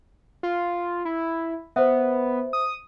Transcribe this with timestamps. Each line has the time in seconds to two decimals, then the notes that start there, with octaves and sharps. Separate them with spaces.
0.43 F4
1.05 E4
1.76 B3 C5 E5
2.53 D#6